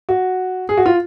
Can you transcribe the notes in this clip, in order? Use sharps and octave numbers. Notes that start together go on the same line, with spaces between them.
F#4
G#4
F#4
F4